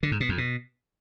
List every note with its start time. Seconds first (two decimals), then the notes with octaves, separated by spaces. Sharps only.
0.03 D3
0.12 G#2
0.20 B2
0.29 F2
0.38 B2